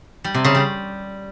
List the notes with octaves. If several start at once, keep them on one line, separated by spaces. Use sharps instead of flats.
G3
C3
C#3
G3